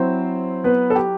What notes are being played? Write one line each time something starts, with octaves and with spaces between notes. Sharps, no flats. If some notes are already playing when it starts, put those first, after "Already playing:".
Already playing: F#3 C4 E4 C5
B3 B4
A4
G4